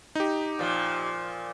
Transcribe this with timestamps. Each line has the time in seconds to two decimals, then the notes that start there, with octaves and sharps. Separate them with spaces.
0.15 D#4 G4
0.59 A#2 F3